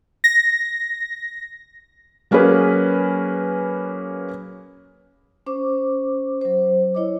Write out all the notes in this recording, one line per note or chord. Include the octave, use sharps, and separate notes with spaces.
A#6
F#3 A#3 C#4 G#4 B4
C#4 C5 D6
F#3 C5
E4 C#5 D#5 D6